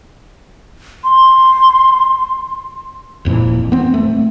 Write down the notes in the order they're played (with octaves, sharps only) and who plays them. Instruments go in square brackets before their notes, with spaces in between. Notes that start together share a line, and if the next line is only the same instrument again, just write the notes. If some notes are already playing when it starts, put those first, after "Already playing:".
[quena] C6
[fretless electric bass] E1 F2 A#2 E3
B3 C4
A3